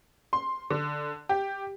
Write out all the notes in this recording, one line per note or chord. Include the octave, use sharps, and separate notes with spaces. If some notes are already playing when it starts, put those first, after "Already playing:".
C6
D3
G4